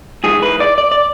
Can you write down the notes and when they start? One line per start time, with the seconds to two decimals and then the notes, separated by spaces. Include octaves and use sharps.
0.24 G#2 E3 G#3 G#4
0.42 B4
0.60 D5
0.78 D5
0.92 D5